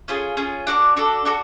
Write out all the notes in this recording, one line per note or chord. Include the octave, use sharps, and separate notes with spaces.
C#4 F4 G#4
C#4 F4 G#4
D4 F#4 A4 D5
D4 F#4 A4 D5
D4 F#4 A4